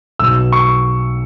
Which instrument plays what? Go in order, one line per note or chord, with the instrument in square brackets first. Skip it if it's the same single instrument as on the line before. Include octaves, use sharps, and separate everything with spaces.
[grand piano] B1 B2 E6
C#6